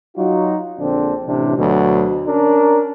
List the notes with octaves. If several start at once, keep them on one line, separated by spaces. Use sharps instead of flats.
F#3 D#4 F4 F#4
A#1 D3 C4 D4
A1 C3 D4
D2 B2 F#3
C#4 D4 A#4